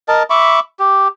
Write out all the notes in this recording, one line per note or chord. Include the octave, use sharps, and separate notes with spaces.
A#4 D#5 A5
E5 B5 C#6 D6
G4